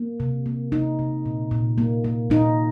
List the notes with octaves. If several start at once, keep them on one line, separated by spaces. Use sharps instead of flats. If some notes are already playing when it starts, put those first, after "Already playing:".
Already playing: A#3
C3
A#3
C3 D#4
C3
A#2
A#2
A#3
A#3
A#2 D#4